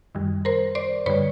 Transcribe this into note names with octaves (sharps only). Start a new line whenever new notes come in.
F#2 D#3 G3
A#4 C5
C5 D5
G2 D3 G3 B4 C#5